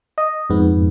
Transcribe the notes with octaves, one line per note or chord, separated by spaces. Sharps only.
D#5
F2 G#2 B3